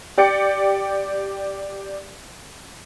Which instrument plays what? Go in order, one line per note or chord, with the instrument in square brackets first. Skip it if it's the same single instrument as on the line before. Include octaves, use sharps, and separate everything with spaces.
[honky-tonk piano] G4 D5 G5 C#7